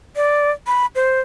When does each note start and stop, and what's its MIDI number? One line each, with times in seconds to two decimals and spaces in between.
0.16 0.51 74
0.67 0.86 83
0.95 1.21 72